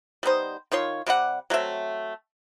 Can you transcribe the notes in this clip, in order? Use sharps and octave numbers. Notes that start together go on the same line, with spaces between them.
G3 B3 D#4 C5
D#3 F4 C#5 C6
C3 G3 E4 F#5
F#3 A3 C4 E5